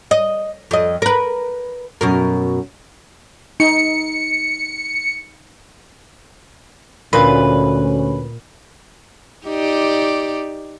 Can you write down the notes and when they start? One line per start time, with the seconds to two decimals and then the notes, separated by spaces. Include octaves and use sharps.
0.11 D#5
0.71 F2 D#5
1.02 A#4 B4
2.01 F#2 B2 A#4
3.60 D#4 C#7
7.13 D2 A#2 C#4 B4
9.46 D#4 G4 D5